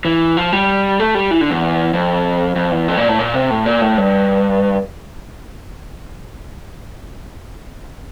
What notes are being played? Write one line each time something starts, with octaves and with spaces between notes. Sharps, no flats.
E3
F3
G3
A3
G3
E3
D3
E2
F2
F2
E2
F2
A#2
A2
A#2
C3
A2
A#2
A2
G2